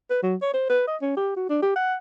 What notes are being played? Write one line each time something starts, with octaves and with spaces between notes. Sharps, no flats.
B4
F#3
C#5
C5
B4
D#5
C#4
G4
F#4
D4
G4
F#5